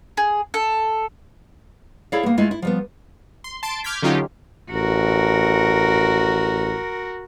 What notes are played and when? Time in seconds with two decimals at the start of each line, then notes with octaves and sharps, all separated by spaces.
0.17 G#4
0.54 A4
2.12 E4 G#4 A4 C#5 D5 F5
2.23 A#3 B3
2.37 G#3 A3 E4 F4
2.51 E4
2.62 F3 G3 B3
3.44 C6
3.63 A5 C6 D7
3.84 D6 F6 G6 G#6 B6
4.02 D3 F#3 C#4 D#4 F4 G4
4.72 A1 F#4 A#4